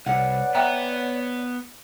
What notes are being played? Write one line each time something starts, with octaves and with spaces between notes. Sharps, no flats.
C2 B4 C#5 D5 F#5
B3 E5 G5 A#5